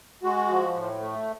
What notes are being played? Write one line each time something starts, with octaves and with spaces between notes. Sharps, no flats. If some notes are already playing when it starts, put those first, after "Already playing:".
G#3 F#4
F3
A2
A3